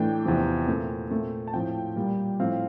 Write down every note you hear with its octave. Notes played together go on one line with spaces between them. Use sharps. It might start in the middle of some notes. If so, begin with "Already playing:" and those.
Already playing: A2 E3 A3 D4 G5
E2 C3 F3 C4
A#2 A3 C4
A#2 A3 C4
A5
A2 F3 C4 G5
A#2 G3 A#3
A2 F3 C4 F5